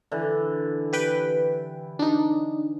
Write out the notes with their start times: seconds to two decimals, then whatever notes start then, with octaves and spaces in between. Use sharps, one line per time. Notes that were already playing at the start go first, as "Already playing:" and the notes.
0.11 D3 E3
0.93 G4 B4 G5
1.99 D4 D#4